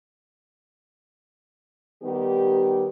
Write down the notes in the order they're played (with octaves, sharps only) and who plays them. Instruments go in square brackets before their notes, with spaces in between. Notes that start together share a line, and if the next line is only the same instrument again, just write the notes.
[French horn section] D#3 G3 B3 D#4 G4